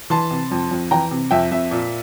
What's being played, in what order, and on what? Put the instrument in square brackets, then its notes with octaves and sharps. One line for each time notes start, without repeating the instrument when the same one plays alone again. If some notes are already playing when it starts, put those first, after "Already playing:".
[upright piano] E3 A5 C6
C3
F2
F2
E3 G5 A#5
C3
F2 E5 G5
F2 E5
A#2